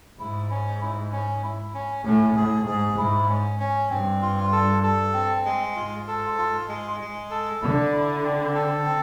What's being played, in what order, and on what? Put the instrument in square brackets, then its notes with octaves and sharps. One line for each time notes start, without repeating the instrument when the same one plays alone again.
[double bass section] G#2 [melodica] E4
[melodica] C#4
E4
C#4
E4
C#4
[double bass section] A2 [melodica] C#4
[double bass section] A2 [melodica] G#4
[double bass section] G#2 [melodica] G#4
[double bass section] G#2 [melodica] E4
[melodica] C#4
C#4
[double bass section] G2 [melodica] C4
[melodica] F4
A4
A4
C4
G#3
[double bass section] G#2 [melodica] F4
[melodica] A4
F4
G#3
G#3
A4
[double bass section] D3 [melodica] E4
[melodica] E4
C4
A4
C4